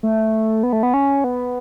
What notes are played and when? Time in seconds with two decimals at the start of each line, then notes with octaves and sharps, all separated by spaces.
0.03 A3
0.63 B3
0.73 A3
0.83 B3
0.94 C#4
1.24 B3